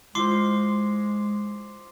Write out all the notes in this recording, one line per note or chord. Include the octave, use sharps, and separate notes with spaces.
G#3 E4 F4 C5 C6 D6 C7